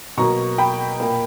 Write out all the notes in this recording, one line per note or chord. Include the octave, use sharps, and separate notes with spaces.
B2 F#3 A#3 A#5 C#6
G5 B5
A#2 A#3